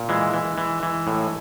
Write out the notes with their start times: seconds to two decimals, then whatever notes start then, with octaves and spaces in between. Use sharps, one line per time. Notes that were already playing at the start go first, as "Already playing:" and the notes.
Already playing: A#2
0.09 E3 G#3
0.34 E3
0.58 E3
0.83 E3
1.07 A2